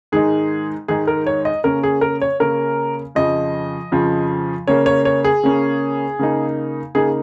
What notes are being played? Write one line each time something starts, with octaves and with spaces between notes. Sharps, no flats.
G#2 D#3 G#3 D#4 G#4
G#2 D#3 G#3 D#4 G#4
A#4
C#5
D#5
C#3 A#3 C#4 A#4
G#4
A#4
C#5
C#3 A#3 C#4 A#4
F2 C#3 F3 D#5
F2 C#3 F3
C#3 A#3 C#4 C#5
C#5
C#5
G#4
C#3 A#3 C#4
C#3 A#3 D#4
C#3 A#3 D#4 G#4